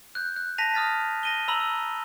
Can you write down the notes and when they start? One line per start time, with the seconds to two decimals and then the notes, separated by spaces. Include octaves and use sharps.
0.15 F#6 G6
0.36 F#6
0.58 A5 A#6 B6 D#7 F7
0.74 D#6 F6 A6 B6
1.23 A#6 D#7 G7
1.48 A#5 B5 E6 F7 F#7